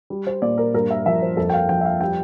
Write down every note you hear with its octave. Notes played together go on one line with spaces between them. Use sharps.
G3
C5
A#2 D5
A#4
G2 A#4
E5
F3 E5
C5
F2 A4
G5
F5
F3 G5
E5
F5
G3 G5